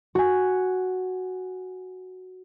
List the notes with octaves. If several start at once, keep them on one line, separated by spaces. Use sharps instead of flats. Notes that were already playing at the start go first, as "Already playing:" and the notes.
F#4 G#5